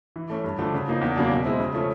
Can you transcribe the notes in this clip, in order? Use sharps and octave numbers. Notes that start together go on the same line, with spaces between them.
E3
A3 C#4
G2
D3 F3 A3 D4
C#3
F3 A#3 D#4
E2
C#3 F#3 A#3 D4
B2
G#3 C4 E4
C#3
F3 A3 C#4